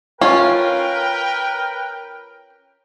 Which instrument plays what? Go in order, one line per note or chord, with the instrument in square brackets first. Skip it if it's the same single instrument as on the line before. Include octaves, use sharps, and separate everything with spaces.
[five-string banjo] C#4 [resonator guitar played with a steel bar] F4 [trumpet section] A#4 B4 G5